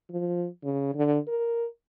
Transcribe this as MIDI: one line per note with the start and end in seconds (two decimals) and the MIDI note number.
0.10 0.46 53
0.64 0.93 49
0.95 1.17 50
1.28 1.66 70